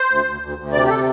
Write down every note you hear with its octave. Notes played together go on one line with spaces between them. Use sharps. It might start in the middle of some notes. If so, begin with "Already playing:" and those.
Already playing: C5
D2
D2
D2
D2
C3 D5
G4
A4